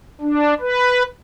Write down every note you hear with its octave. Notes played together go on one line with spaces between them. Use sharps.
D4
B4